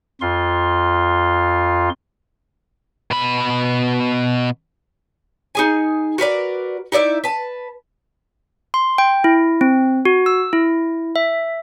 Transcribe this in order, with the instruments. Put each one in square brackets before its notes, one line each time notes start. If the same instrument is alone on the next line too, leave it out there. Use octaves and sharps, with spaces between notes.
[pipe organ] F2 F4 C6
[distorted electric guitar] B2 B5
[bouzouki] D#4 G#4 G#5
F#4 A#4 B4 D5
D#4 E4 D5 E5
B4 A5
[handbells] C6
G5
E4
C4
F#4
E6
E4
E5